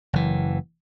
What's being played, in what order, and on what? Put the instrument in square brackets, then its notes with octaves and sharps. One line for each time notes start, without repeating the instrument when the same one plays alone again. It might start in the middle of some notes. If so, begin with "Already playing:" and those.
[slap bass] F#1 E3